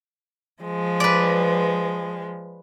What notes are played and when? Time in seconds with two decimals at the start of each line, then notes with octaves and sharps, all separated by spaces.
0.61 F3 G#3
1.00 B4 D5